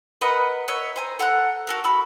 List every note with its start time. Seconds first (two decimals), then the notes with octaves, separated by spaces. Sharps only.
0.21 A#4 B4 D#5 F#5
0.68 C#5 D#5 E5 F#5
0.96 C5 G#5 A#5
1.19 A4 F#5 A#5 F#6
1.67 F#4 A4 A#4
1.84 F#4 B5 E6